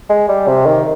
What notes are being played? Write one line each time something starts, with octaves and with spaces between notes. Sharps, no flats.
G#3
G3
C3
D#3